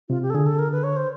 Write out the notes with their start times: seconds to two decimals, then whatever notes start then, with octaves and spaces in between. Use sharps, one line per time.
0.09 C3 F4
0.22 G4
0.30 A4
0.34 D3 G#4
0.46 A4
0.59 A#4
0.72 B4
0.84 C#5
0.96 C5